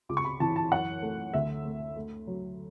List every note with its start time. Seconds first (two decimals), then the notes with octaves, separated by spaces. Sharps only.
0.09 C#2 D6
0.17 C#6
0.25 B5
0.40 E3 A5
0.56 A5
0.71 F#2 F#5
1.02 A3
1.34 D2 E5
1.65 A3
1.96 A3
2.27 F#3